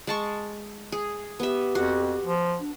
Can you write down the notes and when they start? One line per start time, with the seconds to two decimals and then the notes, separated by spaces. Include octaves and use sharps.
0.07 G#3 A5 C#6
0.92 G#4
1.40 B3 G4 E5
1.75 F2 F#4
2.24 F3
2.60 D4